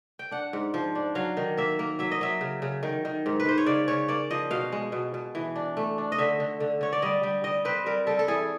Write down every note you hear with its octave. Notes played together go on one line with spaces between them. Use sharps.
G5
D4 F#5
G#2
F3
D4
F#3 F5
D#3
A#3 E5
A#3
F#3 E5
D#5
F#3 E5
C#3
C#3
D#3
D#3
G#2
B4
G#2 C5
C#5
C#3 D5
C#3 C#5
A#3 D5
F3 D#5
B2 F5
G#3
B2
B2
E3
D4
A3
D4
D#5
D3 E5
D3
D3
D3 C#5
D5
G3 D#5
G3
G3 D#5
C4 B4
G3 A#4
G3 A4
A4
E3 G#4